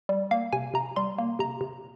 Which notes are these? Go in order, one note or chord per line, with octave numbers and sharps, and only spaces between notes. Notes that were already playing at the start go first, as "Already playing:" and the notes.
G3
A#3 F5
C3 G#5
C3 A#5
G3 C6
A#3
C3 A#5
C3